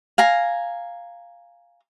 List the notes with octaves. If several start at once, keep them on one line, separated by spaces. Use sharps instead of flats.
F5 G#5 A#5